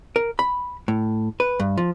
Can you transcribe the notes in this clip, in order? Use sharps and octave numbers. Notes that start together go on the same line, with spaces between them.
A#4
B5
A2
B4
G2
F3